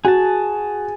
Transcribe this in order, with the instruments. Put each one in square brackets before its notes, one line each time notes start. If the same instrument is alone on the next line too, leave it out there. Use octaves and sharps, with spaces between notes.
[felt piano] F#4 [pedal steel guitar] G#4 A5